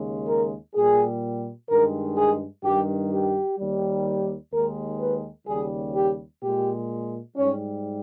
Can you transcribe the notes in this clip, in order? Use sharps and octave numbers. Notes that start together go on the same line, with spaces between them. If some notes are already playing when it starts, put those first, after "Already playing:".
Already playing: D#2 C#3 G#3
A#4
A#2 G3 G#4
G2 D#3 G#3 A#4
G#4
G2 D#3 G3 G4
G4
D#2 D#3 G3
D#2 D#3 G#3 A#4
B4
D#2 C#3 G3 G#4
G4
A#2 G#3 G4
G#2 G3 C#4